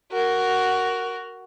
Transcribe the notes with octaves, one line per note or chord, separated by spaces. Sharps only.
F#4 A#4